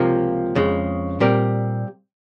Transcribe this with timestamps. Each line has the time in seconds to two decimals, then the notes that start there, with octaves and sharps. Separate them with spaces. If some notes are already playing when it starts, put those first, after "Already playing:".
Already playing: C#2 C3 F3 A#3
0.55 F2 C#3 G#3
1.20 A#2 G3 C4 G4 A#4